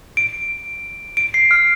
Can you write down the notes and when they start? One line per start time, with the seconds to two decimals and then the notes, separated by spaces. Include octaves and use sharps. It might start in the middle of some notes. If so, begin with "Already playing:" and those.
0.17 D7
1.17 D7
1.34 C7
1.51 F6